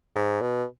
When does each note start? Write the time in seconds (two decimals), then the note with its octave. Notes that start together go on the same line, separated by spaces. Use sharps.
0.16 G#2
0.41 B2